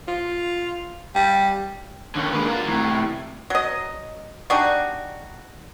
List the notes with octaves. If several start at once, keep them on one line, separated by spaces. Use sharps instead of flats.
F4
G3
D#2 D3 C#4
G#3 A#3 D4 B4
F4 F#4 A#4
A2 C3 E3
F#3 D#5
D4 D#4 F#4 G4